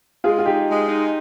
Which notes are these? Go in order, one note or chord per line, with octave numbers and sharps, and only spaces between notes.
G#3 F4 G#4
F4
D#4 G4
G#3
D#4